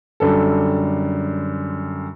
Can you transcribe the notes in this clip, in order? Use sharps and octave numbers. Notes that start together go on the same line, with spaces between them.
F#2 D3 G3 A4